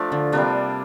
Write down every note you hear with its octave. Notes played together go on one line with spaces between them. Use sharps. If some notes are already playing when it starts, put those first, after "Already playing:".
Already playing: F3 A3 D4 F4
D3
C3 G3 A#3 D4